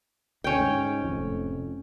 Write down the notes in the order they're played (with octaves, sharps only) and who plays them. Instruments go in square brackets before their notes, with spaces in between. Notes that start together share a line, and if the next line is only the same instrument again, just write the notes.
[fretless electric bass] D2 [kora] C#4 G5
[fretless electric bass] G#2
F1 F2 A2